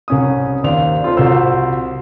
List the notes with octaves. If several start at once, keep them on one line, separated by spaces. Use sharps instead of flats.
C2 C#4 D#6
D#2 C5 D5 F7
C4 F4 A4 C5
C2 F4 F#4 C5 E6